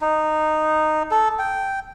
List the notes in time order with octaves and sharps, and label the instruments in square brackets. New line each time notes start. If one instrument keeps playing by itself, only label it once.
[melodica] D#4
A4
G5